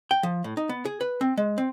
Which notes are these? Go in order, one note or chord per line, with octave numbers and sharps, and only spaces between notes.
G5
F3
A2
D#4
B3
G#4
B4
C4
G#3
C4